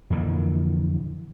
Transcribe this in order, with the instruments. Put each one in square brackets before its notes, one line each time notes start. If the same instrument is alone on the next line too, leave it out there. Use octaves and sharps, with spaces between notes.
[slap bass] F2 A#2 D3 E3